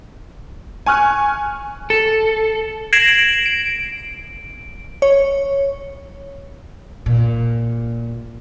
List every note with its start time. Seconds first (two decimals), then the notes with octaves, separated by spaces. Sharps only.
0.86 G#5 C#6 F6 F#6
1.90 A4
2.93 G#6 A#6 C7 D7 E7 F#7
3.46 D7
5.02 C#5
7.06 A#2